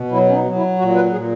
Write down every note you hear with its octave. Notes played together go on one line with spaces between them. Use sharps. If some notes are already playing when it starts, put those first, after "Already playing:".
Already playing: B2
F#3 E4
C#4
D#4
F#3
E4
A#2 F#4
B4
A#2 G#4